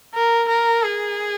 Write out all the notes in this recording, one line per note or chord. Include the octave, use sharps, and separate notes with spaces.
A#4
A#4
G#4